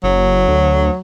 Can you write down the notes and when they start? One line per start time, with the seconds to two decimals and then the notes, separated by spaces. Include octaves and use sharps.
0.04 F#1 F#3
0.48 D2